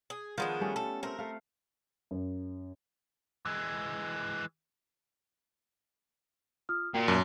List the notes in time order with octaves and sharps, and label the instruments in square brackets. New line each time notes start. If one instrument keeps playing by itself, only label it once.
[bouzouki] G#4
[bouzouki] D#3 G#3 D4 [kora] F3 B3 F4
[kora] G3 A3 C#4
[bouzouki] A4
[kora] A3 C4 [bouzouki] A#4
[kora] A3 F5
[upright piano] F#2
[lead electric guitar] E3 G#3
[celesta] F4 D#6 F6
[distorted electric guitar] A#2 [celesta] F#4 G5 C7
[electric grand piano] F#2 [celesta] A5